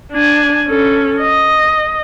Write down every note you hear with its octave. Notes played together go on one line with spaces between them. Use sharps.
D4 G#5
C#4 A4
D#5